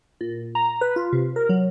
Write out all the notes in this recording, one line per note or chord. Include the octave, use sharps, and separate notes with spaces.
A#2
A#5
B4
F4
C3
A#4
F#3